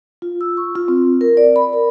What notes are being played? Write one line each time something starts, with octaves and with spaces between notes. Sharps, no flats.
F4
E6
C#6
F4
C4
A#4
D5
B5
A#4